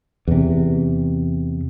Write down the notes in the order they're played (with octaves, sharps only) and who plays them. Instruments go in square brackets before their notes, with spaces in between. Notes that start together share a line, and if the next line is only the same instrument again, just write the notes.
[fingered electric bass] E2 C3